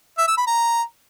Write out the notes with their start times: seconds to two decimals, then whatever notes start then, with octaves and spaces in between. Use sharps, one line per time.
0.18 E5
0.28 E6
0.37 B5
0.47 A#5